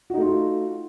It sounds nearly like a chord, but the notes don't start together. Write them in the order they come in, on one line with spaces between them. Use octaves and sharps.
F#4 D#4 A3 F4